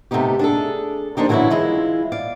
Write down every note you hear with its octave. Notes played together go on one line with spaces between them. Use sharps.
C3 A3 B3 D#4 G4
D4 G#4 A4
F3 A#3 D4 D#4 G4
D3 E3 F#3 G3 C#4 E4
E3 G#3 E4 F4
D5 F5